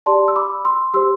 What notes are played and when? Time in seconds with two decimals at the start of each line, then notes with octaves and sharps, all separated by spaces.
0.06 G4 D5 A5 C6
0.28 E6
0.36 B5 D6
0.65 C6 E6
0.94 G4 C5 C6 E6